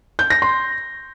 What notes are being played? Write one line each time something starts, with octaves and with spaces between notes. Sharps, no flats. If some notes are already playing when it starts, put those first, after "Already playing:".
G6
A#6
C6